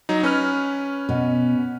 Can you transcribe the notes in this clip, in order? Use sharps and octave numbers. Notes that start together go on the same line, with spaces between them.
F#3 D#4
C#4 B4 F6
B2